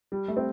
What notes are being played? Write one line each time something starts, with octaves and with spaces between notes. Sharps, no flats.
G3
A3
C4